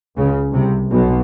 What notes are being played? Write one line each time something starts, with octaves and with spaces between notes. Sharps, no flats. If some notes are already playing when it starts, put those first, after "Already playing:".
C#2 C#3
C2 C3
B1 B2